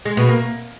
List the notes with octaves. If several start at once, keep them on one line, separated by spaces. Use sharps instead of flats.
G#3
B2
A#3